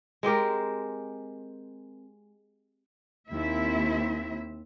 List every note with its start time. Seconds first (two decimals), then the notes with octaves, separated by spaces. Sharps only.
0.23 G#3 C4 G4 A#4
3.31 D#2 C4 E4 E5